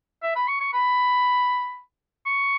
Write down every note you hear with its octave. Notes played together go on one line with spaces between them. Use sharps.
E5
B5
C#6
C#6
B5
C#6